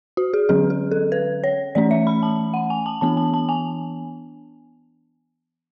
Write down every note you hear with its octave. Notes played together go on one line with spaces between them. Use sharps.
F#4
G#4
D3 F#3 C#4 G#4
G#4
A4
B4
C#5
E3 A3 C#4 D5
E5
B5
A5
F#5
G#5
A5
E3 B3 D4 A5
A5
A5
G#5